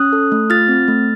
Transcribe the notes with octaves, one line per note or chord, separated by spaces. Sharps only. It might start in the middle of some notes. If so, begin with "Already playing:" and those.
Already playing: C#4 D#6 F#6
A4
A3
F4 F6 A6
C4
A3